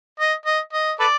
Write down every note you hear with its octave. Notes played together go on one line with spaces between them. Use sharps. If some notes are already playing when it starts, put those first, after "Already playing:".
D#5
D#5
D#5
A4 B4 D5